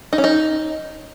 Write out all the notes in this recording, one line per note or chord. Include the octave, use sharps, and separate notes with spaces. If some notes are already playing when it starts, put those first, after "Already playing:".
D#4
C#4
D#4